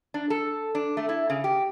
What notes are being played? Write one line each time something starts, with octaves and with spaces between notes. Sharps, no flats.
D4
A4
D4
A3
E4
C#3
G4